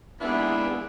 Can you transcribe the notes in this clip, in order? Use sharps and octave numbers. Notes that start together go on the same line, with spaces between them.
D#2 G#3 B3 D4 E4 B4